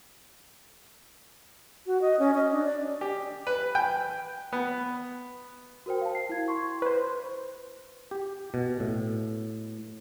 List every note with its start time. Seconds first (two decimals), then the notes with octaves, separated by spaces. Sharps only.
1.87 F#4
2.01 D#5
2.19 C#4
2.35 D#5
2.52 D4
2.65 D5
3.01 G4
3.47 B4
3.75 G5
4.52 B3
5.86 F#4 A#4 C5 G5
6.01 F5 G5 A5
6.15 C7
6.29 E4 G#6
6.48 C6 C#6
6.82 B4 C5
8.11 G4
8.54 B2
8.80 A2